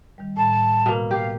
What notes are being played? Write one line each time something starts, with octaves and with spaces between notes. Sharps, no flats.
D#3 G3
A2 A5 B5
B2 A#3
G4 F5